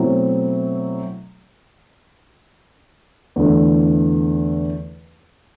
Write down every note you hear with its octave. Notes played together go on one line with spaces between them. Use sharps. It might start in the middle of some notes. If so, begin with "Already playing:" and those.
Already playing: B2 F#3 A3 C4 E4
E2 D3 A3 E4